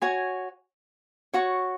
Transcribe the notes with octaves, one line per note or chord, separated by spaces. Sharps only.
F#4 C#5 G#5
F#4 C#5 F#5 C#6